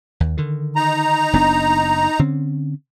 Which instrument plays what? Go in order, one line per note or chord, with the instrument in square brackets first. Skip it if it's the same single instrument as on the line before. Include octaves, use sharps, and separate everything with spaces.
[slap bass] D#2
D3 D#3
[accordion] D#4 A#5
[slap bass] F#1 B3 D4
D3 C4 C#4